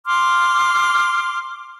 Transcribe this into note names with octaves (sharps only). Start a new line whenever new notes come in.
C6 D6 F6